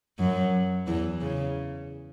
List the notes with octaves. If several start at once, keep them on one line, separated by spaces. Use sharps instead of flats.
F#2 F#3
E2 E3
C#3